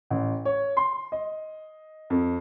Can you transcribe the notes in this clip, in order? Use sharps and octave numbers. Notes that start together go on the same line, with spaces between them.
A1
C#5
C6
D#5
F2